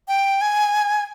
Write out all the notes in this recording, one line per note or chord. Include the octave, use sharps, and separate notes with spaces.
G5
G#5